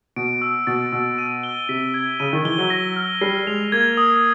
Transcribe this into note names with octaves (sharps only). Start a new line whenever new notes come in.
B2 D7
E6
B2 A6
B2 E6
D#7
G7
C3 B6
G#6
C#3 D#7
D#3
E3 G7
F#3
A#6
F6
G3 C7
G#3 F7
A#3 G#6
D#6